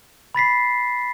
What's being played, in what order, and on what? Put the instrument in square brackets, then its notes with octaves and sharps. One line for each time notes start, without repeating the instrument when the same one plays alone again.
[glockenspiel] B5 A6 B6 C7